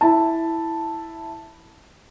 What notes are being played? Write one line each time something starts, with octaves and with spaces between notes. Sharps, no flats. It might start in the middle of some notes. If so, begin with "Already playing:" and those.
E4 A5